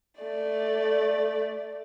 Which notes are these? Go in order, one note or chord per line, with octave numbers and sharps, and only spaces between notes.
A3 D5